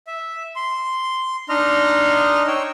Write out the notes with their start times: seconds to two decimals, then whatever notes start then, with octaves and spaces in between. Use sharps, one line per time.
0.07 E5
0.56 C6
1.49 D4 D#4 D#5 C6 F6
2.47 C#5 G5 E6